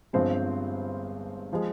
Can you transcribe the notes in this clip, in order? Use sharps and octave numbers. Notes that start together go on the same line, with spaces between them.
G1 G2 F3 G#3 C4 C5
F3 G#3